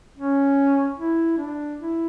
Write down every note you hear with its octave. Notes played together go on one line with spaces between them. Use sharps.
C#4
E4
D4
E4